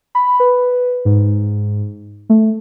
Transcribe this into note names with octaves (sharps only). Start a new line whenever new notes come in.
B5
B4
G#2
A3